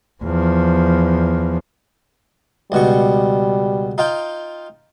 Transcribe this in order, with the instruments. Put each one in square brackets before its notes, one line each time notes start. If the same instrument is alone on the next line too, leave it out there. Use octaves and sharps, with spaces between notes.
[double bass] E2 F3
[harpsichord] C#2 B2 C#6 [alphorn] G3
[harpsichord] D#4 F4 G5